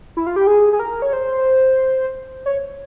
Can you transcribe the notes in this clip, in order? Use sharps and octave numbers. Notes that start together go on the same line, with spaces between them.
E4
F4
G4
G#4
G#4
A#4
C#5
C5
C#5